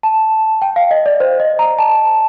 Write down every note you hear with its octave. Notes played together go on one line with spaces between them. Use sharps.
A5
G5
F5
D#5
D5
C5
D#5
A#5
A5